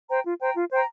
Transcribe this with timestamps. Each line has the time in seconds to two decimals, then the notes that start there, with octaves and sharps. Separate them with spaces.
0.08 C5 G5 A#5
0.24 F4
0.40 C5 G5 A#5
0.55 F4
0.71 C5 G5 A#5